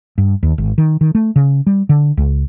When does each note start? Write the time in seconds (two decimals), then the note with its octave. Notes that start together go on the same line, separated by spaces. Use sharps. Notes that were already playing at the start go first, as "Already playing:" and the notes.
0.18 G2
0.43 D#2
0.58 G#1
0.78 D#3
1.01 D#3
1.15 A3
1.36 C#3
1.67 G3
1.89 D3
2.17 C#2